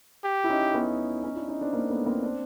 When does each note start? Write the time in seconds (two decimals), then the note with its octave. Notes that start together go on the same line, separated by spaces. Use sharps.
0.24 G4
0.44 E4
0.49 C#4 D#4
0.74 B3 C#4
1.23 C#4 D#4
1.36 D4 E4
1.48 C#4 D#4
1.61 C4 D4
1.73 A#3 C4
1.90 A3 B3
2.06 A#3 C4
2.22 C4 D4